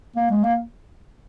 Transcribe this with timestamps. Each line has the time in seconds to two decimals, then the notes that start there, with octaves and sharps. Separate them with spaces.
0.16 A#3
0.31 G#3
0.43 A#3